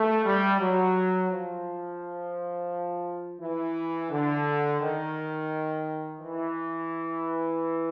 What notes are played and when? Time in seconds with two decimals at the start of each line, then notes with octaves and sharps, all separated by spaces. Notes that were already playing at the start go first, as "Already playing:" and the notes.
Already playing: A3
0.25 G3
0.60 F#3
1.30 F3
3.40 E3
4.11 D3
4.80 D#3
6.20 E3